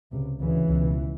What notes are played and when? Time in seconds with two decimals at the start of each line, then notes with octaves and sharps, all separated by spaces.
0.12 C#2 C3
0.40 D2 C#3 E3
0.70 C#2 B2